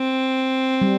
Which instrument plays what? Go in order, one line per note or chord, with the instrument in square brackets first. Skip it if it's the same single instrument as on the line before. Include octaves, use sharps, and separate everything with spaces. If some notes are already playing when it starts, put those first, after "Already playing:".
Already playing: [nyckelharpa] C4
[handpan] G3